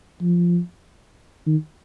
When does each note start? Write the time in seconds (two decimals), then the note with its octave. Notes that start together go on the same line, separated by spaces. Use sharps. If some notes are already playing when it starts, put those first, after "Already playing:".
0.22 F3
1.46 D#3